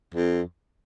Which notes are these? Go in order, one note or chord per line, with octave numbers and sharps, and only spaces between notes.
F2